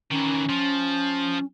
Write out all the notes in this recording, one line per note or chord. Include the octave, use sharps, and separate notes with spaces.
D#3 E3 C#4
F3